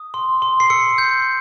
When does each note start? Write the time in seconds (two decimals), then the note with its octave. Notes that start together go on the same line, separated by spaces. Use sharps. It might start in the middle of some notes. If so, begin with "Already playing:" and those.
Already playing: D#6
0.14 C6
0.42 C6
0.60 C7
0.70 E6 C#7
0.98 G6